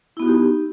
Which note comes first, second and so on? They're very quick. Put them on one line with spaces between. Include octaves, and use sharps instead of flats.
E4 B3 F#4 D#4 G4